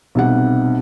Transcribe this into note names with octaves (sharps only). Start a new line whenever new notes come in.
B1 C3 G3 F#5